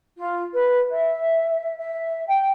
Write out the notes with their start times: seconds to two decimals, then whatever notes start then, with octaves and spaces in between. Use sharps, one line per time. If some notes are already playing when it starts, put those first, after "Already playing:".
0.18 F4
0.53 B4
0.91 E5
1.77 E5
2.27 G5